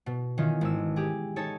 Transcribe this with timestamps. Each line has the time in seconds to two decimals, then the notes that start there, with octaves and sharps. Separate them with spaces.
0.06 B2
0.38 D#3 E3 C#4 D#4 F4
0.61 G#1 E6
0.96 G4 G#4
1.36 D#4 A4 C#5 A5